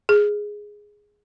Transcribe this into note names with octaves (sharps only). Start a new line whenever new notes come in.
G#4